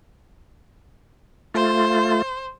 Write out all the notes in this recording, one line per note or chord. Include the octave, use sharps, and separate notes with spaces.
A3 F4 C5